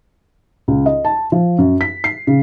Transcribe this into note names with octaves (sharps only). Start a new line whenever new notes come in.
C#2
D#5
A5
F3
F#2
B6
C7
C#3